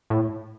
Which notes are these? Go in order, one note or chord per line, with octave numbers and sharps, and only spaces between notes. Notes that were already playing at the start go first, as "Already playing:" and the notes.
A2